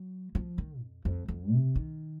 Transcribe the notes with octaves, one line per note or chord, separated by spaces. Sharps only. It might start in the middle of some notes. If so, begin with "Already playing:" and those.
Already playing: F#3
F3
D#3
F2
F2
F2
C3
D#3